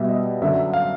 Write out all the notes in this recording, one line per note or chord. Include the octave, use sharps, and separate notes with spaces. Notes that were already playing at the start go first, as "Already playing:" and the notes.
Already playing: B2 G3 E5
D#5
F#2 D3 F#3 E5
F5